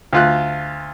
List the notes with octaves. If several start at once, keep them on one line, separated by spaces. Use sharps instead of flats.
D2 F4 F#6